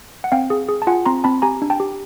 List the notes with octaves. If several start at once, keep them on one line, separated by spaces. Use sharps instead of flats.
F#5
C4 F5 G5
G#4
G#4
A5
F4 F#5 G#5
C4 A#5 C6
C4 A5 B5
G4 G#5 A#5
D4
G5 A5
G4